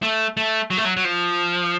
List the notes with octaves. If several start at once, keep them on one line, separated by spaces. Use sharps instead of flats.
A3
A3
F#3
A3
F#3
F#3
F3